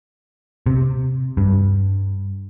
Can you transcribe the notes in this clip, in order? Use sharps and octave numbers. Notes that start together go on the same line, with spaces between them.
C3
G2